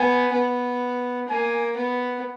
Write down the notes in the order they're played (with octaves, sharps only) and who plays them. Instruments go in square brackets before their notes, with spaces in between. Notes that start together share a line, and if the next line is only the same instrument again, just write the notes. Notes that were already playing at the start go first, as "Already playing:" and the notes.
Already playing: [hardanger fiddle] B3 [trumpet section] G#5
[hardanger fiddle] B3
[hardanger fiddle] A#3 [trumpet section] G#5
[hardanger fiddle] B3